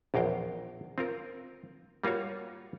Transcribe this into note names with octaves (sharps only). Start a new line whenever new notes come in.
A#1 E2 A#4 F5 G5
C4 F4 A#4
G3 A#3 F4 F#4 C#5